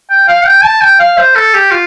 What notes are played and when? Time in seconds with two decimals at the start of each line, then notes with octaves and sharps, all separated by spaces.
0.10 G5
0.28 F5
0.45 G5
0.64 A5
0.81 G5
0.99 F5
1.18 C5
1.35 A4
1.54 G4
1.71 F4